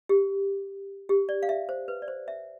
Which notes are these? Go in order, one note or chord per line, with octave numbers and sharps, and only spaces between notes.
G4
G4
D5
F5
E5
C5
B4
D5
C5
E5